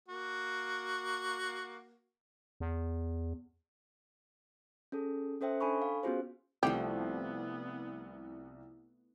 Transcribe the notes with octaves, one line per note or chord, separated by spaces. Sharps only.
A#3 F#4
E2
C#4 G#4 A4
C#4 A4 C5 E5 G5
D4 A4 G#5 B5 C#6
F5
B3 C#4 F4 F#4 G#4 C5
C2 F3 G3 A3 B3 G4